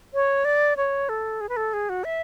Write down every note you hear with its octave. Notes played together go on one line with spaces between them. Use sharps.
C#5
D5
C#5
A4
G#4
B4
A4
G#4
F#4
E5